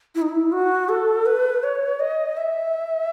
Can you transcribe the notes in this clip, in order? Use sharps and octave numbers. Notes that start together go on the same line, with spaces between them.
E4
D#4
E4
F#4
A4
B4
C#5
D#5
E5